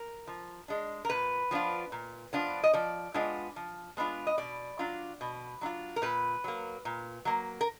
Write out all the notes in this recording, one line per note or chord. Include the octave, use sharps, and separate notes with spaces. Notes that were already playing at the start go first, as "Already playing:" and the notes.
Already playing: A#4
F3
G#3 D4
A#4
A#2 B4
F3 B3 D4 F4
A#2
F3 B3 D4 F4
D#5
F3 D5
G#3 B3 D4 F4
F3
G#3 B3 D4 F4
D#5
B2 D5
F#3 D4 F4
B2
F#3 D4 F4
A#4
A#2 B4
F#3 A#3
A#2
F#3 A#3
A#4